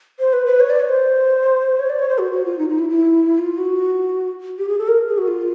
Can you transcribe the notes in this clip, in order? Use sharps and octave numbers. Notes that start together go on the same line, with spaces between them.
C5
B4
B4
C#5
D5
C#5
C5
C#5
D5
C#5
C5
F#4
F#4
F4
D#4
D#4
E4
E4
F4
F#4
G4
G#4
A4
A#4
G#4
F#4
F4